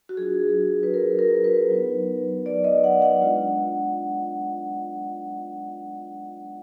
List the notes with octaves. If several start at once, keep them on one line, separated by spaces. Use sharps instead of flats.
F#4
F#3 D4 F4 G#4
B4
A#4
A#4
B4
F#3 B3 D#4
D5
D#5
F#5
F#5
G#3 D4 F4